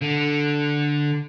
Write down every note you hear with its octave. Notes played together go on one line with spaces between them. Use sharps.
D3